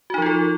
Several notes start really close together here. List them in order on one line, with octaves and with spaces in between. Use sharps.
F#4 D#4 F3 F4 A4